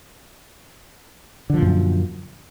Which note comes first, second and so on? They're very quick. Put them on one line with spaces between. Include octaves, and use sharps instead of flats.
D3 F3 A#2 F#2